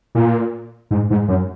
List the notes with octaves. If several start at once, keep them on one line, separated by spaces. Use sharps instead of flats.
A#2
G#2
G#2
F#2